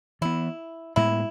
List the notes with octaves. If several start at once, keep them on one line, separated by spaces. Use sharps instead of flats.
E3 B3 E4
A2 G#3 B3 E4